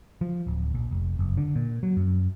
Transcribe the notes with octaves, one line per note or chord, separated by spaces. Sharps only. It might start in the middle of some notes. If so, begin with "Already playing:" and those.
F3
D1
A#1
F1
F#1
D3
A#2
F#3
F#2